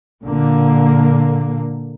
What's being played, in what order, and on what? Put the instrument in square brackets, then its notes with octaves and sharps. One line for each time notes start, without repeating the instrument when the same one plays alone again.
[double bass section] A#2 D3 A#3